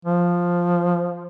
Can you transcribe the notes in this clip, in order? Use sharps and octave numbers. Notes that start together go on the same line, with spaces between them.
F3